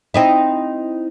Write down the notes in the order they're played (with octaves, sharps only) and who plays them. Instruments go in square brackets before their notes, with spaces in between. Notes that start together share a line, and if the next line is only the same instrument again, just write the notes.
[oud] C4 D#4 E4